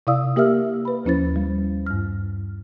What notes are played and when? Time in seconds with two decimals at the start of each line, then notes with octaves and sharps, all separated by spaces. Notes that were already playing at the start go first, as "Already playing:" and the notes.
0.07 C3 E4 D5 F5 D#6 E6
0.36 A#3 G4 A#4 E5 E6 F6
0.85 B4 B5
1.05 D#2 F3 C#4 E4 C5 A6
1.36 G3
1.86 G2 F6